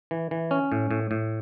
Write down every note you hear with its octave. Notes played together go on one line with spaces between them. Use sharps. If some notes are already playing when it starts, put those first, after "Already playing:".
E3
E3
C#4
A2
A2
A2